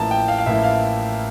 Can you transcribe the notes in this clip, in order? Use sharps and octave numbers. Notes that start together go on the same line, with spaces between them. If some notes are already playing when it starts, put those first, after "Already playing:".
Already playing: A1 A2 F3 A#3 E4 A5 A#5
G5
F5
F5
A1 A2 F3 A#3 E4 E5
F5